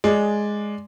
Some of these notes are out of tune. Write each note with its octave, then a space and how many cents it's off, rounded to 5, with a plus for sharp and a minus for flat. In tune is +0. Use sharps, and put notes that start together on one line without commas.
G#3 +0 D5 +0